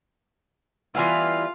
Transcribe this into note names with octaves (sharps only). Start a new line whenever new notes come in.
E3 G3 B3 E4 F4 F5 G#5